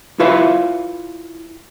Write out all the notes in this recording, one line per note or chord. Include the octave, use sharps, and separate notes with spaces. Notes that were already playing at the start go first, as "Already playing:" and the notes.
E4 F4 B4 C#5 E5 F5